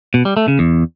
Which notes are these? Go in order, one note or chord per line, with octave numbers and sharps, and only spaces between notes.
B2
G3
A3
C#3
E2